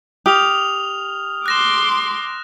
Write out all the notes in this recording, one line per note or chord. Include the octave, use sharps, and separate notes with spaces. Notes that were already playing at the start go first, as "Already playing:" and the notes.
G4 D#6 F6 F7
C6 D6 F#6 A#6 E7